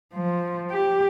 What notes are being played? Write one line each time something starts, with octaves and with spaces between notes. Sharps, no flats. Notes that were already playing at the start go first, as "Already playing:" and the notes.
F3
G4